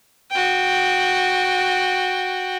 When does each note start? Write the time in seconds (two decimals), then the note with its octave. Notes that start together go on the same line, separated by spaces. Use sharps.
0.31 F#4 G5